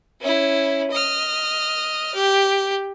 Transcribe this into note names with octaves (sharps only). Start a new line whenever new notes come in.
C#4 E4
D#5 F6
G4